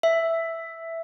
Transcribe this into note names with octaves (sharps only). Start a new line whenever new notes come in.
E5